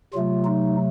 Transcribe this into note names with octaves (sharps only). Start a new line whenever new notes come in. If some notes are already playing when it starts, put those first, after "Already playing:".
C3 F#3 A3 F4
D#4